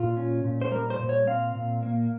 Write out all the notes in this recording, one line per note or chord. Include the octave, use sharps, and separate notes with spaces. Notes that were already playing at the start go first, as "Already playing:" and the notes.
Already playing: A#2 F4
C#4
A#2
C5
G3 A#4
C5
A#2
C#5
C4 F5
A#2
A#3